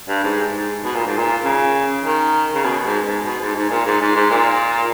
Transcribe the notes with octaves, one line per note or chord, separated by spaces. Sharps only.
G2
G#2
G#2
B2
A#2
G#2
A#2
C#3
D#3
C#3
B2
G#2
G#2
B2
G#2
G#2
A#2
G#2
G#2
G#2
A#2